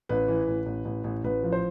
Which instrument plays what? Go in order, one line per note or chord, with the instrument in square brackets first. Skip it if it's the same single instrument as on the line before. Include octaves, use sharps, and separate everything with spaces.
[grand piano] A1 B4
E3
A1
A1
A1
A1
A1 B4
F3
C5